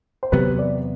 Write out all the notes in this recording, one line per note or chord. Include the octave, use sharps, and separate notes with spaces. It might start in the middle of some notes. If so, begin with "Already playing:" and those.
C5
E2 C3 F#3 B3 G4 B4
B4 D5